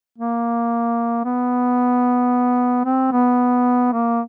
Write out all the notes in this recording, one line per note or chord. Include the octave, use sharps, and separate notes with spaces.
A#3
B3
C4
B3
A#3